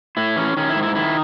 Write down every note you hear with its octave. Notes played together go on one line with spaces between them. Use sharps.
A2 E4
E3 C#4
D#3 C#4
E4
G#2
E4
D#3 E4